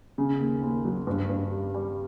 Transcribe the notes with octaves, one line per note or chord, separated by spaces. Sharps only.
C#3
D#2
D#2
F#3
G2
G2
G3
G3